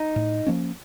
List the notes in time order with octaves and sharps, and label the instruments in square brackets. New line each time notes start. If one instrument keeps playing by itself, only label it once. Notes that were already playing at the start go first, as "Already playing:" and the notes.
Already playing: [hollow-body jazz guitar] D#4
[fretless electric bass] A2
F3 A#3 C#4